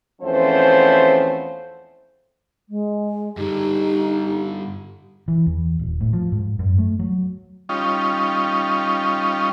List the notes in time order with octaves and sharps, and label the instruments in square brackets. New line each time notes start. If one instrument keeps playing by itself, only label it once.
[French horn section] E2 F3 A3 C4 C#4 C5
[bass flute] G#3
[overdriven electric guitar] G2 D3 [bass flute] D#4 [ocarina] G4
[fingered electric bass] E3
E2
D#1
A2
F3
G#2
F#2
A3
F#3
[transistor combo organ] G3 C#4 D#4 F4